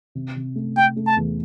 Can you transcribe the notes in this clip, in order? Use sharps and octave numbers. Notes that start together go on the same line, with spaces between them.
C3
C3
A3
A3 G5
A3
A5
E2